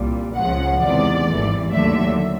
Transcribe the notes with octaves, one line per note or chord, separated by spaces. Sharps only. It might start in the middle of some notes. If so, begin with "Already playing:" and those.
Already playing: C2 A#2 G3
C#2 C#3 F3 G#3 F#5
E2 C3 D#3 G#3 D5
G#1 G2 E3 A3
D#2 D3 F#3 A3 E5